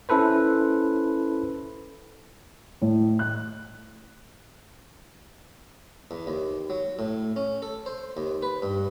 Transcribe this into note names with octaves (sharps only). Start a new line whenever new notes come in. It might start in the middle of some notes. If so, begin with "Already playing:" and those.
C#4 E4 A4 B4 C5
A2
F#6
E2
D#2
F#3
A2
C#4
A4
C5
D#2
B4
G2